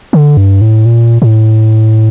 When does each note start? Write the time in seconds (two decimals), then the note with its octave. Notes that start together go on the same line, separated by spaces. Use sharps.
0.13 D3
0.37 G2
0.61 A2
0.86 A#2
1.22 A2